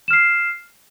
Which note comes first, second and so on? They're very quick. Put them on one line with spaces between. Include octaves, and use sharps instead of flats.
E7 F6 C7